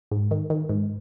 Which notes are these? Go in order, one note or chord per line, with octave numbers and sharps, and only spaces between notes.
G#2
D#3
D#3
G#2